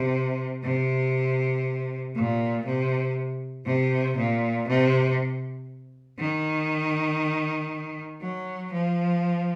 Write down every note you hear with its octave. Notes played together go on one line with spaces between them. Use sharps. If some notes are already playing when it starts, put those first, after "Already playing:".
Already playing: C3
C3
A#2
C3
C3
A#2
C3
D#3
F#3
F3